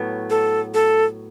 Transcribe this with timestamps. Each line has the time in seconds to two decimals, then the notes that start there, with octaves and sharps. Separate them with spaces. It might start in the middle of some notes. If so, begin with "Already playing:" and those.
Already playing: A2 F#3 B3
0.30 A4
0.74 A4